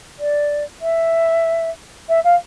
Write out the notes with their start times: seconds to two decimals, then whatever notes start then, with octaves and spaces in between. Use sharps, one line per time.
0.19 D5
0.81 E5
2.08 E5
2.24 F5